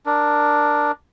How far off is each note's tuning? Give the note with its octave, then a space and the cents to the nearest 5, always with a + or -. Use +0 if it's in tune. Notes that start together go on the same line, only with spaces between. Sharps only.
D4 +5 A#4 +0